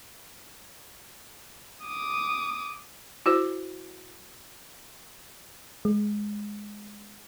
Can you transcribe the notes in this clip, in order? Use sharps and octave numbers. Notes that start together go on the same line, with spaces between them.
D6 D#6
E4 F#4 C5
G#3